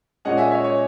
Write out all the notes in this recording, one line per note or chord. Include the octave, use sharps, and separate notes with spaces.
A#2 G#3 C#4 D#5 F#5
E5 G#5
D#5
C#5 E5
C#5